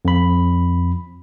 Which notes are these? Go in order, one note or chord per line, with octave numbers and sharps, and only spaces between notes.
F2 B5